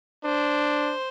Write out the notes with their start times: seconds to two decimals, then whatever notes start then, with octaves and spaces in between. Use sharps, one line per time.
0.24 D4 C5